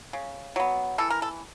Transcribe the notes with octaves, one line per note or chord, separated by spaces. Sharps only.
C#3
F#3 B3
E3 A4
A#4
A4